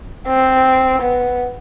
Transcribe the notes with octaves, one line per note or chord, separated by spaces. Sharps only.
C4
B3